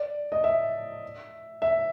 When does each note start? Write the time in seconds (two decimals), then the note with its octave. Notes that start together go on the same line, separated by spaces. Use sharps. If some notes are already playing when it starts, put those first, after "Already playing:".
Already playing: D5
0.32 D#5
0.44 E5
1.62 E5